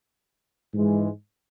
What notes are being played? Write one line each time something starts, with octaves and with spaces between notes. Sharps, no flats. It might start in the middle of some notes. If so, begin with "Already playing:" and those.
G#2 E3 G#3